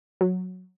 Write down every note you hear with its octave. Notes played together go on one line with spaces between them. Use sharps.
F#3